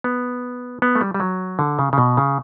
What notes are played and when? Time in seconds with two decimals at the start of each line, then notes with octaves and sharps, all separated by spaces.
0.04 B3
0.82 B3
0.95 A3
1.01 G3
1.14 G3
1.20 F#3
1.59 D3
1.79 C#3
1.93 C#3
1.98 B2
2.17 C#3